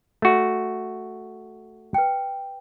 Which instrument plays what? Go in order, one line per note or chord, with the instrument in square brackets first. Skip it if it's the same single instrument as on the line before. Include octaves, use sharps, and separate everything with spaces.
[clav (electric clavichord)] A3 F#4
[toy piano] B4 G5